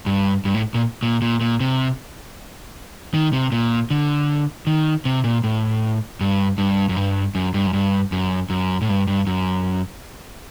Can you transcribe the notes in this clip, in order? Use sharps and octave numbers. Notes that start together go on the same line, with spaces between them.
G2
G2
A2
A#2
A#2
A#2
A#2
C3
D#3
C3
A#2
D3
D#3
C3
A#2
A2
G2
G2
F#2
G2
F#2
G2
F#2
G2
F#2
F#2
A2
G2
G2
F#2